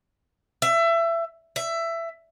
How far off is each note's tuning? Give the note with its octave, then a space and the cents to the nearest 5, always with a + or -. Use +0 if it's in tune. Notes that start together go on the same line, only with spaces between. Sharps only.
E5 +25
E5 +15